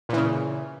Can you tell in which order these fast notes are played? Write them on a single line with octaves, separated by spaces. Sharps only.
A#2 E3 C#3